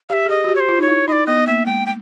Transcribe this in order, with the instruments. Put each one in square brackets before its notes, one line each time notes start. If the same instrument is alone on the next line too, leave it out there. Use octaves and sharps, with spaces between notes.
[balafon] G4 [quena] E5 F5
[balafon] G#4
[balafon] G4 [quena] D#5
[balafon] F#4
G4
[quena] C#5
C5
[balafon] F4
[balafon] D#4 [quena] C#5
[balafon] E4
[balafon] D#4 [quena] D#5
[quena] D5
[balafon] B3 [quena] D#5
[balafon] B3
[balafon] A#3 [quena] E5
[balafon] G#3 [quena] G5
[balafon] A3 [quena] G5